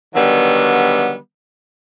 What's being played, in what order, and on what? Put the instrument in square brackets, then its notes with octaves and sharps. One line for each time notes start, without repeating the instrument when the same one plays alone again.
[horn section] D3 D#3 F#3 G3 B3